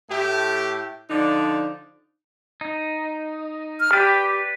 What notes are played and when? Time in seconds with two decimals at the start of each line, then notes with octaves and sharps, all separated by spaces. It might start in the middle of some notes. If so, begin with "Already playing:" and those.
0.10 A2 A3 E4 G4
1.09 D3 F3 D4 D#4 D5
2.61 D#4
3.80 F6
3.93 G4 B4 D5